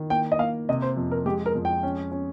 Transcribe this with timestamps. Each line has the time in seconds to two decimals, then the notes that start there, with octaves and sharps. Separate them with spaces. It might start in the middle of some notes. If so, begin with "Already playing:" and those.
Already playing: D#3
0.10 A#3 G5
0.32 D#5
0.39 A#3 F5
0.69 C3 D#5
0.82 C5
0.97 F2
1.11 A#4
1.26 G#3 G4
1.46 A#4
1.55 F2
1.65 G5
1.83 C#4
2.12 C#4